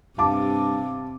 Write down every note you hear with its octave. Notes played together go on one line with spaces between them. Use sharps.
G2 C3 F5 A5 D6